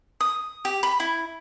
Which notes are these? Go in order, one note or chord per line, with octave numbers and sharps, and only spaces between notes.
D#6
G4
B5
E4